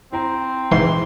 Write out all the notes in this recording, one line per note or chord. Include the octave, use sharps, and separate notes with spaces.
C4 E4 C5 A#5
G#2 E3 C6